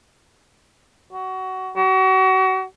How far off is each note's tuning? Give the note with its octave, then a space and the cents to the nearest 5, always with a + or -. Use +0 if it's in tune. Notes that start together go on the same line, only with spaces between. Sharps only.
F#4 +20
F#4 +35